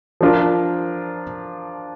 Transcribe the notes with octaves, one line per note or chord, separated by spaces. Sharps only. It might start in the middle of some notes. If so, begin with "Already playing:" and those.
F3 D4 F4 A#4